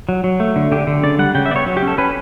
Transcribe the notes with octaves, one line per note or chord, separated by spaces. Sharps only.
F#3
F#3
A3
D3
D3 G4
D3
C#3 D5
G3 F#5
C#3 G5
E5
B3 D5
C#5
F#3
G4
C#4
A4
C#4 B4